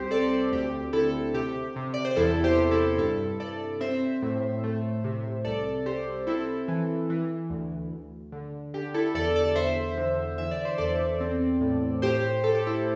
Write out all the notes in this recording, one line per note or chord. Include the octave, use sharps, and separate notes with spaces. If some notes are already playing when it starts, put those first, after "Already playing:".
Already playing: C2 C4 G4 C5
C4 A4 D5
D2 G4
D3 E4 A4
C3 G4
C3
D5
C5
E2 E4 A4
G4 C5
C3
E4 A4
G2 E4 A4
G2 A4 D5
C4 C5 E5
A2
A3
C3
C2 A4 D5
C3 G4 C5
C4 E4 A4
E3
E3
D2
D2
D3
D3 G4
E4 A4
E2 A4 D5
A4 D5
E2 C5 E5
D3
E3 E5
D5
C5
E2 A4 D5
C4
A2
A2 G4 C5
A2 A4
G4
E4 A4